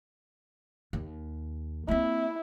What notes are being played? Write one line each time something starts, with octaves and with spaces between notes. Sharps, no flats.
D#2
A#3 C4 E4